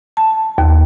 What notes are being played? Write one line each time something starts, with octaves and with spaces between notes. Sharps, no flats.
A5
D#2